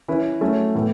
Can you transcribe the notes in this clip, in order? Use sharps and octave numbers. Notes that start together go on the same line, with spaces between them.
E3 C#4 E4 B4
F#3 A3 C#4 A4
A2 E3 B3 A4